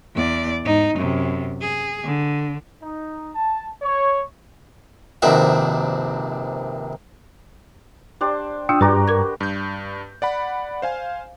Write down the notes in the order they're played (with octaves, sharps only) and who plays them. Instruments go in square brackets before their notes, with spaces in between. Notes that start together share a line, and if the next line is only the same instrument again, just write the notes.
[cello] E2 D5
G#2 D#4
F#2 C3
G#4
D3
[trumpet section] D#4
A5
C#5
[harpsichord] A#1 G2 C3 D#3 F#4 E5
[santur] D4 G4 C5
[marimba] D4 [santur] F4 [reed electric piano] G5 D#6 E6
[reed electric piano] G2 A#5 [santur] G3 F#4 G4 [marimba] B4
[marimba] A#4 D6 G#6
[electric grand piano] G2 G6
D5 F#5 B5
C5 F5 G#5